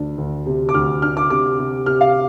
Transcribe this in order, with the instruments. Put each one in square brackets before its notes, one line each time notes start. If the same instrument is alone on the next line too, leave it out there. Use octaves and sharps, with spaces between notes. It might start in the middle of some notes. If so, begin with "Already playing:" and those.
Already playing: [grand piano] D2 D4
D2
C3
D6
D2 F6
D4 F6
D6
C3 D6
C3
C3 F6
F5